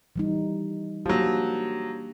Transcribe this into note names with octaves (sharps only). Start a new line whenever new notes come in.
E3 G3 D#4
F3 F#3 A#3 D4 G4